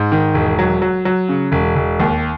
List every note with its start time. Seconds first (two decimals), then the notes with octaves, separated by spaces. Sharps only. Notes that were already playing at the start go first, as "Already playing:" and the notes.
Already playing: G#2
0.12 D#3
0.34 E1
0.59 F#3
0.82 F#3
1.05 F#3
1.29 C#3
1.52 E1
1.76 E1
2.00 D#2